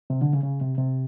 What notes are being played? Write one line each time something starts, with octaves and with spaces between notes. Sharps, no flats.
C3
D3
C#3
C#3
C3
C3